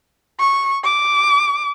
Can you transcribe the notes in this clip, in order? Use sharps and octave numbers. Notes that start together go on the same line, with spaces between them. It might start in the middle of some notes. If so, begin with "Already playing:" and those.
C#6
D6